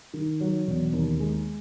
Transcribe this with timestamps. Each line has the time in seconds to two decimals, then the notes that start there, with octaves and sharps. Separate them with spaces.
0.14 D#3
0.41 F#3
0.67 E1
0.93 D#2
1.20 G#3